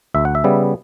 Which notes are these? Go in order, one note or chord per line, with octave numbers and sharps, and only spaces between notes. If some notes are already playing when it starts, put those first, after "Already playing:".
D2 E5
F#5
E5
C#3 G3 B3